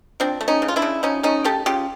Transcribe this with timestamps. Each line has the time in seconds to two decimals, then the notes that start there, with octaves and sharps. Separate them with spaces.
0.20 F3 C4 D4
0.41 A3
0.48 C#4 D#4
0.62 C#3
0.68 F4
0.76 D4 E4
0.82 C#3
1.03 F3 C#4 D#4
1.23 A3 C#4 D#4
1.44 C#3 G4 A4
1.66 C#3 F4 G4